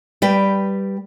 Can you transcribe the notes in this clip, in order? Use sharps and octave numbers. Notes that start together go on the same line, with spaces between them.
G3 B4 G5